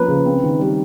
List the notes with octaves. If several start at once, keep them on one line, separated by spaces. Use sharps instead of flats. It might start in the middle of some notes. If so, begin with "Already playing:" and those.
Already playing: F3 A#3 C#4 B4
C#3
C4
D#3
G3